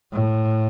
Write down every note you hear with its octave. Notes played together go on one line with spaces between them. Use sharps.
A2